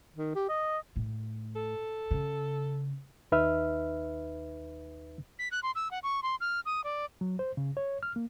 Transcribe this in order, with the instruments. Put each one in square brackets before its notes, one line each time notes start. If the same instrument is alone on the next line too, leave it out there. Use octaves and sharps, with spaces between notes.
[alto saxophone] D#3
G4
D#5
[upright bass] A2
[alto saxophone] A4
[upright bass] C#3
[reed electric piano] D#2 D#4 B4 E5 F6
[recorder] B6
F#6
C6
E6
F#5
C#6
C6
F6
D#6
D5
[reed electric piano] F#3
C5
C#3
C#5
F6
A#3